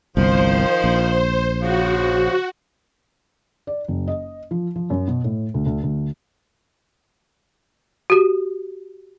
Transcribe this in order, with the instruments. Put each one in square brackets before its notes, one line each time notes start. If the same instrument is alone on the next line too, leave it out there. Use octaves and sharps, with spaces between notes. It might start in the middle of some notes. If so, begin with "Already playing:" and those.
[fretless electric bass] G1 C2 [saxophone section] D#3 F3 [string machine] C5
[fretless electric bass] A#1
[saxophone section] C#3 F3 [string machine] F#4
[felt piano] D5
F#1
D#5
F3
F3
F#2
B2
A2
D2
D2
D2
[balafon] F#4 G4